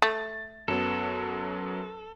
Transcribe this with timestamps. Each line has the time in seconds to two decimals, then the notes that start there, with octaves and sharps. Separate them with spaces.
0.02 A3 A6
0.68 F#2 F#3 B3 A4